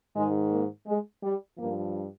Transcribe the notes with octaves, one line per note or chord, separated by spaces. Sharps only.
G#2 D#3 G#3
A#3
G#3
G3
G2 F3 A#3